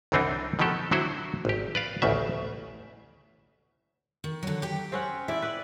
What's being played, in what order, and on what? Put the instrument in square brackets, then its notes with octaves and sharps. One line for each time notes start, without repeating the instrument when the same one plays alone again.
[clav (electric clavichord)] C2 F#2 E3 C4 D4 D#4
B2 D#3 F3 F#3 G4 A4
D3 F#3 E4 F#4 C5
G#1 G4
B4 D5 F5
A1 D2 C#3 E5
[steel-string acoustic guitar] D#3
D3 F#3
G4 G5
[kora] C4 C#4 F#5
[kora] E4 D5 [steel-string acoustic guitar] E5
[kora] B4 D5